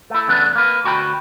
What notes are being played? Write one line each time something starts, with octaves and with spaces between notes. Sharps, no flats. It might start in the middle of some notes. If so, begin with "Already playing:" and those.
A3 E4
E2 C#3 A3 B3 D4
A#3 B4
D2 F#4 G5 A5 B5